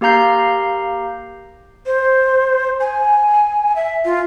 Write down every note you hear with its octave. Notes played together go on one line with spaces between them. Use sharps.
A#3 G4 F5 A#5 G6 C7
C5
G#5
E5
F4